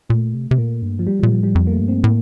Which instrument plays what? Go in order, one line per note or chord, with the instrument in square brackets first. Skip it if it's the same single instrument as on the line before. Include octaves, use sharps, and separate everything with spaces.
[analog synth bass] A#2 [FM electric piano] A3
[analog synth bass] C3
C3
[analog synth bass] A#2 [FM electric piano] A#3
[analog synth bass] G2
[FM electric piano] F3
G3
F3
[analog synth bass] A#2
[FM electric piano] F3
[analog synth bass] A2 [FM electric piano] G3
[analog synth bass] F2 [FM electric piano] G3
[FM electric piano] A#3
A3
[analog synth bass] G2
[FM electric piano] C4
[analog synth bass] A2 [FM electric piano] A#3